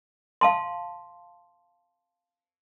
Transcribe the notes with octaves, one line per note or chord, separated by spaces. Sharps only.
F5 A5 C6